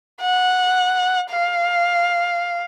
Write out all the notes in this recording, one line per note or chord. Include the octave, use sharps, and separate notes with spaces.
F#5
F5